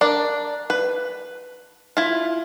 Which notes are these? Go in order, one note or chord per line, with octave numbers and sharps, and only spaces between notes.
D4 A#4 D5
B4
E4 F4